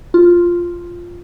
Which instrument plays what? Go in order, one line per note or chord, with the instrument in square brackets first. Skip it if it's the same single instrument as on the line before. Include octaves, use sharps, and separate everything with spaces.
[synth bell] F4